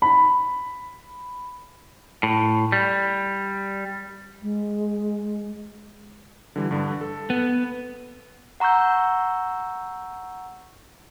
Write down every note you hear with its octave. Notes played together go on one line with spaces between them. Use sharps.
B5
A2
G3
G#3
D3 E3 G3
G2 D3
A4
B3
F#5 A#5 C#6 E6 G6